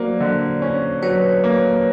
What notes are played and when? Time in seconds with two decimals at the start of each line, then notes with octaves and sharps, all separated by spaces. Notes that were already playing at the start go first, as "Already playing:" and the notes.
Already playing: F#3 A#3 C5 D5
0.21 D3
0.62 C#4
1.03 F#3 B4 C#5
1.44 A#3